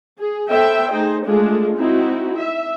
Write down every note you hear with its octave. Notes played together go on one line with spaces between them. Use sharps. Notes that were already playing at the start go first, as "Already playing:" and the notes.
G#4
B3 A4 C5 E5 G5
A3 D#4 G#4 C5
G#3 A3 D4 F4 G#4
C4 D#4 E4 F#4
E5